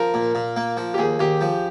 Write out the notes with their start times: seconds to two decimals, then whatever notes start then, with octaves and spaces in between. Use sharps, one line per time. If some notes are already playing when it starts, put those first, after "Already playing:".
Already playing: F3 A#4
0.14 A#2
0.35 A#2
0.56 A#3
0.77 F3
0.94 G4
0.98 D#2 G#4
1.19 D#2 G4
1.41 F3